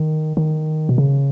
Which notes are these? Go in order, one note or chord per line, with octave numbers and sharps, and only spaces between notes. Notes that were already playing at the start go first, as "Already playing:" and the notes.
Already playing: D#3
D#3
B2
C#3